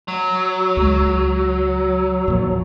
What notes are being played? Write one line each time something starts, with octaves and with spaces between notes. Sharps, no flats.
F#3
C#2 G#3
D#2 A#2 F3